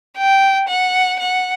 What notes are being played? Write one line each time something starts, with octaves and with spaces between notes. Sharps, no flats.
G5
F#5
F#5